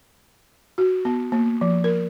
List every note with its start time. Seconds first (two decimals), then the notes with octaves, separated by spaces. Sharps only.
0.78 F#4
1.05 B3
1.32 A#3
1.61 F3
1.84 A#4